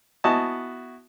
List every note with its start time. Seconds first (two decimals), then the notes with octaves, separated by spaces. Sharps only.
0.24 B3 E4 F#4 D#5 G#5 A5